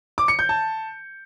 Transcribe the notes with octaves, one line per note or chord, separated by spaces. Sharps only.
D6
C#7
G6
A5